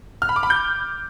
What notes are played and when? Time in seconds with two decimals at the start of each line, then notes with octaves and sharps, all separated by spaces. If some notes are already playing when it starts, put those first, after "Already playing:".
0.22 F6
0.29 B5
0.36 D6
0.43 B5
0.50 G6